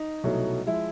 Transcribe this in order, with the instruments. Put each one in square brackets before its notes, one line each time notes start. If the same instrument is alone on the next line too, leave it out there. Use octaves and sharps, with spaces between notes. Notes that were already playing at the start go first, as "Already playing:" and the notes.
Already playing: [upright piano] D#4
C2 B2 F#3 A3
F3 G#3 E4